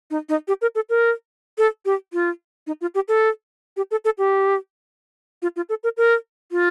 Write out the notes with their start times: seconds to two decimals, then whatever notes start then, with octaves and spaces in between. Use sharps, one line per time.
0.11 D#4
0.29 D#4
0.48 G4
0.62 A#4
0.75 A4
0.90 A#4
1.58 A4
1.85 G4
2.13 F4
2.67 D#4
2.81 F4
2.95 G4
3.08 A4
3.77 G4
3.91 A4
4.05 A4
4.18 G4
5.42 F4
5.56 F4
5.69 A4
5.84 A#4
5.97 A#4
6.51 F4